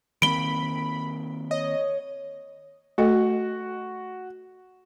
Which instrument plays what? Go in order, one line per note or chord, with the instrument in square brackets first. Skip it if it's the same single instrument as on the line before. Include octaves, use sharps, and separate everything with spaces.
[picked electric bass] D#3 A#3 C4 [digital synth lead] B5 [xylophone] D7 G7
[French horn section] C#5 [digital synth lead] D#5
[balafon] A3 A4 D#5 [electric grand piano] F#4